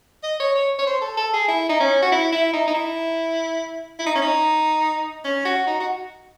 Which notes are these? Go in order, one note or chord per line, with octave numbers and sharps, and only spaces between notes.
D#5
C#5
C#5
C#5
C5
A4
A4
G#4
E4
D#4
C#4
F#4
E4
E4
D#4
D#4
E4
E4
D#4
C#4
D#4
C#4
F#4
D#4
F#4